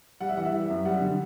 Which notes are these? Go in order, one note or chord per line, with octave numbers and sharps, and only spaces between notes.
G3 F#5
E5
E3 F#5
E5
G3
F#2
G3 F#5
D3